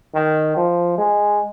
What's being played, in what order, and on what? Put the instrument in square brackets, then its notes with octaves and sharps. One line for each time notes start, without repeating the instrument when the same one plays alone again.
[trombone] D#3
F3
G#3